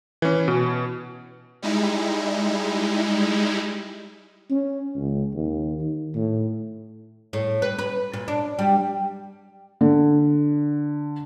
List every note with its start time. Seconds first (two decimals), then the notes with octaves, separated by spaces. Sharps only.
0.22 E3 C#4
0.48 B2
1.62 G3 G#3 D#4 E4
4.51 C#4
4.96 C#2
5.34 D#2
5.81 D#3
6.15 A2
7.33 A2
7.62 B4
7.79 B4
8.13 A#2
8.28 D4
8.59 G3
9.81 D3